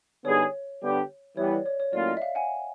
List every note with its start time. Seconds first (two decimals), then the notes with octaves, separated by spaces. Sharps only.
0.25 D3 G3 B3 D#4 G#4 C#5
0.81 D3 G3 B3 D4 G4
1.37 E3 G3 B3 C#5
1.52 D5
1.66 C#5
1.80 C#5
1.93 A2 F#3 A#3 C#4 F4 D5
2.07 D#5
2.17 E5
2.22 F5
2.35 F#5 G#5